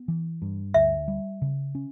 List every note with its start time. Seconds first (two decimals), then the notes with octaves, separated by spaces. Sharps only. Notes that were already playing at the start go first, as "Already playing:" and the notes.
Already playing: B3
0.08 E3
0.42 G2
0.74 D2 E5
1.08 G3
1.42 C#3
1.75 C#4